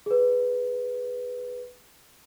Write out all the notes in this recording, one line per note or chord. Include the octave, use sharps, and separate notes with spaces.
G#4 B4